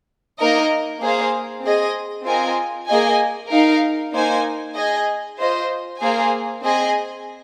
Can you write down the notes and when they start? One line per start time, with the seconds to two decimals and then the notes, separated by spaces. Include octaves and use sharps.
0.38 A#3 D#4 A#4 D#5
1.01 A#3 G#4 C5 F5
1.64 C4 G#4 D#5
2.26 C4 F4 A#4 D#5 G#5
2.88 A#3 G#4 D#5 G#5
3.51 D#4 A#4 F5
4.14 A#3 D#4 C5 G#5
4.76 G#4 D#5 G#5
5.38 F4 C5 D#5
6.00 A#3 G#4 C5 F5 G#5
6.62 C4 G#4 D#5 G#5